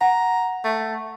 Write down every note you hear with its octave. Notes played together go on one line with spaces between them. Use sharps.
F#5 A#5
A3